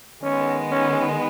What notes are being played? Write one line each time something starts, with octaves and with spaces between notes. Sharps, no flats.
D#3 G#3 B3 C#4
C#4